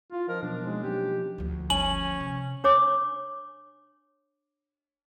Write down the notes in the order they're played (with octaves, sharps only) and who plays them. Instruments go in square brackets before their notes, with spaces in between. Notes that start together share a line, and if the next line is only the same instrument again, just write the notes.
[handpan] E4 [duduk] F4
[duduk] F3 [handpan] C#4 D#5 [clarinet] A#4
[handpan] B2 F#3 C5 [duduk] F3 [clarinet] D4
[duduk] G#3 [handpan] A#3 D#4 F#4
[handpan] F3 F#3 C#4 [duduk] G4
[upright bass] D2 F3
[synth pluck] G1 G#5 [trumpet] C#4 [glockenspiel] F#7
[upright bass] C3
[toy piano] D4 C#5 D6